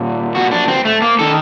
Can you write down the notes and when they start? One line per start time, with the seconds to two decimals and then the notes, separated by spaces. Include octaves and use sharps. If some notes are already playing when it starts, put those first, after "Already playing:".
Already playing: A#2 G3
0.35 F#4
0.51 D4
0.68 C4
0.85 A3
1.02 A#3
1.19 D#3 A4